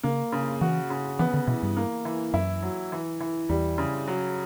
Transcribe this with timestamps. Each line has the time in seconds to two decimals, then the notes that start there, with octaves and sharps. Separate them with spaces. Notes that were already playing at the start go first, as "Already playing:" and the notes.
0.03 C#3 A#3
0.32 C#3
0.61 E3 F#4
0.90 C#3
1.19 E3 B3
1.34 D3
1.47 B2 E3
1.62 G2
1.77 A#3
2.05 E3
2.34 F#2 E4
2.63 F#3
2.92 E3
3.20 E3
3.49 E2 G3
3.78 C#3
4.08 F#3